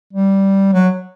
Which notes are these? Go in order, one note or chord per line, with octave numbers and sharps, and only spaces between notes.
G3
F#3